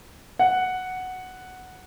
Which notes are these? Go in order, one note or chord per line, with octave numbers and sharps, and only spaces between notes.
F#5